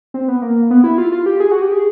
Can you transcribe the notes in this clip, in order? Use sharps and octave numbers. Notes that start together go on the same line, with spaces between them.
C4
B3
A#3
B3
E4
F4
F4
G4
G#4
F#4
G4
G#4